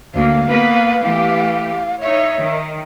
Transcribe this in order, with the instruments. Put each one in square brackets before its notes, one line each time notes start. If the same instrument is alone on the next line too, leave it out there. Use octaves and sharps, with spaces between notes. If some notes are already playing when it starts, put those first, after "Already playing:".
[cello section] D2 A#3 [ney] F5
[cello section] A#3 B3 B4
E3 A3 G4
[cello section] D#4 C#5 [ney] E5
[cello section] D#3